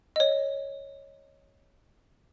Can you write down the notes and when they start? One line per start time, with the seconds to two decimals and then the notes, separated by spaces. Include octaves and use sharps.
0.16 C#5 D#5